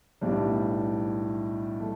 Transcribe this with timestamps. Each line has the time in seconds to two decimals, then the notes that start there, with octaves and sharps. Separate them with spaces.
0.21 B1 A2 G3 D4
1.80 A3